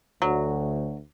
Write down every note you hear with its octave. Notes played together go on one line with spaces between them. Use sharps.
D2 F#3